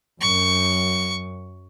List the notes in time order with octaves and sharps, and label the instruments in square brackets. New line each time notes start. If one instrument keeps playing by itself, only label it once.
[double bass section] F#2 [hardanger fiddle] C#6